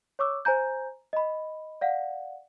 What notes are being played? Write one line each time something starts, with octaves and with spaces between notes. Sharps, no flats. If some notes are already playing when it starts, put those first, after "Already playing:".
C#5 C#6 D6 E6
C5 G#5 A#5 G6
D#5 B5
D5 F5 F#5